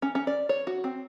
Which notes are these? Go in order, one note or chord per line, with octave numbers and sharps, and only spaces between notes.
C#4
C#4
D5
C#5
F#4
C4